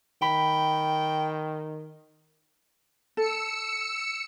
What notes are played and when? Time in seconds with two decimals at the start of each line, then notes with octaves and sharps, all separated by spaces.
0.22 D#3 G5 B5
3.17 A4 E6 C#7